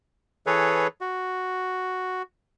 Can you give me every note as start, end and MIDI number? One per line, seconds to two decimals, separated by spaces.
0.47 0.87 52
0.47 0.87 68
0.47 0.87 69
0.47 0.87 71
0.47 0.87 73
1.01 2.22 66